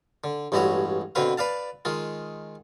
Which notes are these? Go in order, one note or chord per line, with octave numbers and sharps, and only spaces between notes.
D3
A1 G2 G#3 E4 F#4 C#5
B2 D3 C4 B4 F5
B4 D5 F5 A5
D#3 G#3 F4